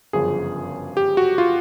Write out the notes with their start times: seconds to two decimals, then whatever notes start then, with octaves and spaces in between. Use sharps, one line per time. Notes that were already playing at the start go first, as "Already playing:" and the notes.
0.13 G1 F#2 C#3 F3 G#4
0.97 G4
1.17 F#4
1.38 F4